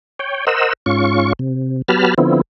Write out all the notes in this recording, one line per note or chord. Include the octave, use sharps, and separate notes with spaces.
C#5 G5
A#4 C5 D#5 F#5 E6
G#2 C#4 F4 C#6
C3
F#3 B3 G4 A5 B5 F6
D3 F3 B3 C4 E4